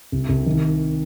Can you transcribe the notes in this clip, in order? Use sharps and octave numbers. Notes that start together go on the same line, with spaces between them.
C2
C2
D#3